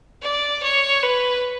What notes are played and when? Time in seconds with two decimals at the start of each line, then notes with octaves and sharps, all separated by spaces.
0.23 D5
0.63 C#5
1.03 B4